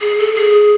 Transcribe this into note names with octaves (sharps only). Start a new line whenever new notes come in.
G#4
A4
G#4